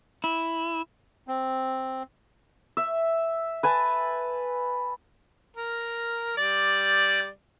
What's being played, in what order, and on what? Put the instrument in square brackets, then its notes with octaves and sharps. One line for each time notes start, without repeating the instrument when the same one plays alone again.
[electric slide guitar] E4
[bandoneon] C4
[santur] E5
B4 G#5 A5
[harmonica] A#4
G3 D5